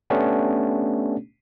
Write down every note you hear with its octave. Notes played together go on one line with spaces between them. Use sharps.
A3 B3 C#4 D4 G4